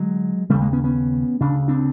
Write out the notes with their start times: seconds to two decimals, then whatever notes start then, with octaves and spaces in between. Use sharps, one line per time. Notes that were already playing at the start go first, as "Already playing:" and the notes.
Already playing: D3 F#3 G#3
0.49 D#2 C#3 G3 A3
0.61 G#3 A#3
0.73 B3 C#4
0.84 B3 C#4
1.41 D2 C#3 D4
1.68 C4 D4